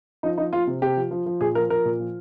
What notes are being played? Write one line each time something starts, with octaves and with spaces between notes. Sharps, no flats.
F3 D#4
F3 D#4
F3 F4
C3
C3 G4
F3
F3
F3
A#2 G#4
F3 A#4
F3 A#4
A#2
F3